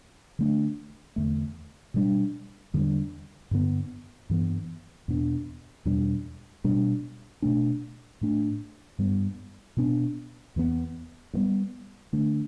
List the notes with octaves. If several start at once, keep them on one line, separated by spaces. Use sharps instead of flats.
D3 A3 D4
E2 D3 A3
B2 G3 B3 D4
E2 D3 G3 D4
G2 D3 B3
G2 E3 B3
E2 B2 B3 D4
E2 B2 G3 D4
B2 G3 D4
B2 A3 D4
A2 A3 D4
G2 G3 B3
B2 B3 D4
E2 E3 B3
G2
G3 B3
D3 A3 D4